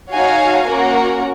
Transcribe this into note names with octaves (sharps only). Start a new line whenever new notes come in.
D#4 F#4 C#5 F5 G#5
A#3 C#4 F#4 A#4